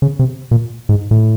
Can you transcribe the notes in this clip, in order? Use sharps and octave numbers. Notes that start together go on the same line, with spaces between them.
C#3
C3
A#2
G#2
A2